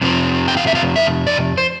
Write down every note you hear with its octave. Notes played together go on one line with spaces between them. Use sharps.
F2 C3 F3
G5
F5
E5
F5
E5
D5
C5